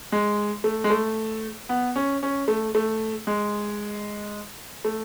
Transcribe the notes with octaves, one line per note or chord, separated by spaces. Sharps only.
G#3
A3
G#3
A3
B3
C#4
C#4
A3
A3
G#3
A3